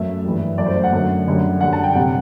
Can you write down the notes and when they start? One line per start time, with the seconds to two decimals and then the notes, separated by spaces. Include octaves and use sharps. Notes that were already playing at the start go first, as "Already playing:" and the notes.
Already playing: F#2 A3 E5
0.24 G2 E3 G3
0.58 F#2 F#3 A3 D5
0.66 C5
0.75 D5
0.84 F#5
0.92 F#2 D3 F#3 A3
1.27 F#2 D3 G3
1.61 F#2 D3 G3 F#5
1.73 A5
1.84 G5
1.95 C3 G3 F#5